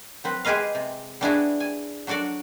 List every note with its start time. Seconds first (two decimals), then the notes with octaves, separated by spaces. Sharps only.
0.24 F#3 C4 B4
0.45 G#3 G4 G#4 B4 D#5 F5
0.75 C3
1.21 G3 B3 D4 E4 F#4 G#4
1.60 G#5
2.07 F#3 D4 F#4 A4 D5